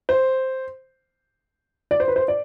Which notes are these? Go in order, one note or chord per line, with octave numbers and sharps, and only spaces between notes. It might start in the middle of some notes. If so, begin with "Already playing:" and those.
C5
D5
C5
B4
C5
D5